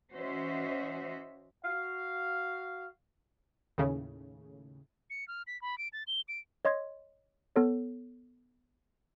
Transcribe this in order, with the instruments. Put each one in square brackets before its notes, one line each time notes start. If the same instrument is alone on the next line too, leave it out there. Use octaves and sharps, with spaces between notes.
[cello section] E3 C#4 F#4 C5 D#5 E5
[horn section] F#4 F5
[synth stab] D#2 A2 C#3
[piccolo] C#7
F6
B6
B5
D7
A6
G7
D7
[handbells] C#5 D#5 C6 G#6
B3 A4 C#5